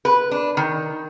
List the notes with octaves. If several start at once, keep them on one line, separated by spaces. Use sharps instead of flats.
B4
D4
D#3